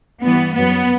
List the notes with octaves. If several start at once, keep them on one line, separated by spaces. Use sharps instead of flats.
G2 E3 G3 B3
F#2 F#3 B3